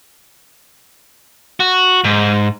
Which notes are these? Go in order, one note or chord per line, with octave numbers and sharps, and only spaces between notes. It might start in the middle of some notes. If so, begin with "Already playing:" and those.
F#4
G#2